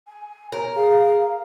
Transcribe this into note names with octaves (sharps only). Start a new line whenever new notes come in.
G#5
A#4 C#5
G#4 F5